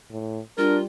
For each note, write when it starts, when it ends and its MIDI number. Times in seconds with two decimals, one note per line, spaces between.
0.11 0.39 45
0.58 0.86 55
0.58 0.77 62
0.58 0.83 65
0.58 0.77 70